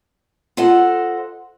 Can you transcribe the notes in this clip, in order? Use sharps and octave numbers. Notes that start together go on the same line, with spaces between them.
F4 A4 C5 D#5 F#5